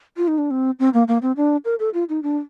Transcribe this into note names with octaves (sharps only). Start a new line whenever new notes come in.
F4
D#4
D4
C4
C4
A#3
A#3
C4
D4
A#4
A4
F4
D#4
D4